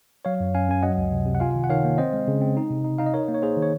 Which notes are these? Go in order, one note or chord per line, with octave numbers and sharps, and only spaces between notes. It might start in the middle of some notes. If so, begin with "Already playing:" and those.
F#3 C#5 F5
F#2
F#2 F5 G#5
F#2 G#5
F#3 D#5 F#5
C#2
C3
C3
F#5
F4 F5 G#5
D#3
F#5
D#3 C#5 F5
A#3
C4 C5 D#5
G#3
C#3
C4
D#4
C3
D#4
D#4 F5
D#5
D#4 A#4 C#5
A#3
C#5
A#3 G#4 C5
D#3
C#5